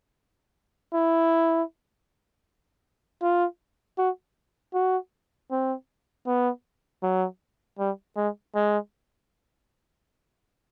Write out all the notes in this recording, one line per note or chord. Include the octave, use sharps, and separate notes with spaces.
E4
F4
F#4
F#4
C4
B3
F#3
G3
G#3
G#3